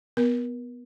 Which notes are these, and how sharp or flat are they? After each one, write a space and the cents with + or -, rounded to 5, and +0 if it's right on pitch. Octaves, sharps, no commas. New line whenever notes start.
B3 +0 A#4 +35